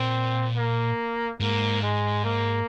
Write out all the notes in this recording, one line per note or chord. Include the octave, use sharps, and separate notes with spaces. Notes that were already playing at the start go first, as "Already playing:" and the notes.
Already playing: A#2 C4
A#3
G#2 A#3
G#3
A#3